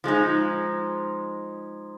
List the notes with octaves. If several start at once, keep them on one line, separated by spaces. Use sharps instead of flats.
F3 G#3 D#4